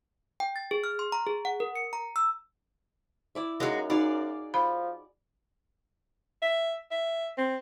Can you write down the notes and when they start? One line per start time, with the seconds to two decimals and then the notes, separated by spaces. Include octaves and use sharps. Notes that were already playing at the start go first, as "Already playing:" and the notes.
0.40 G5
0.56 A6
0.71 G#4
0.84 F6
0.99 C6
1.12 A#5
1.27 G#4
1.45 F#5
1.60 A#4
1.76 C#7
1.93 A#5
2.16 E6
3.35 E4 D5 E5
3.60 F#2 G#3 D#4 F#4 F5
3.90 D#4 F#4 G#4 D5 F5
4.54 F3 B5
6.42 E5
6.91 E5
7.37 C4